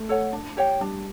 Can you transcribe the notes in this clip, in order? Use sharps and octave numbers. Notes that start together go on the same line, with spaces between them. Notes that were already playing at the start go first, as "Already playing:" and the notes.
Already playing: A3
A4 C#5 F#5
D4
G4 C#5 G5
G3 D4